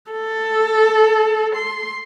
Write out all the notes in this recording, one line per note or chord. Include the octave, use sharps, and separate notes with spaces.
A4
C6